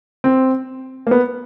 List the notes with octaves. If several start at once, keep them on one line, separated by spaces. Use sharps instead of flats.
C4
A#3
B3